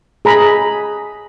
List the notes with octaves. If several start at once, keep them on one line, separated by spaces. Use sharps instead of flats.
G#4 A#5 B5